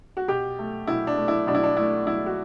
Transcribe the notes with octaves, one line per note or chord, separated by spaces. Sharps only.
F#4
B2 G4
A3
B2 E4
D4
A3
E4
B2 D4
E4
D4
A3 E4
B2 E4
F#4